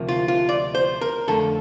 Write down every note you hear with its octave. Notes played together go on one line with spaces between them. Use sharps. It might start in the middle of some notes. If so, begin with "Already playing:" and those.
Already playing: D2 C3 F3 A#3
F4
F4
D5
C5
A#4
F2 D3 A3 A4